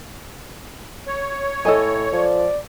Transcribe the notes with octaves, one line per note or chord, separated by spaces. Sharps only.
C#5
A2 A4 D#5 G#5
F3 D5